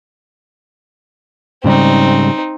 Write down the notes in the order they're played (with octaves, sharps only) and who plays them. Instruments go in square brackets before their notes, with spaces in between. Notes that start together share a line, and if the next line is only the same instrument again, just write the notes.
[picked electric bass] G#2 C#3 G3 [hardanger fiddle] C4 D#4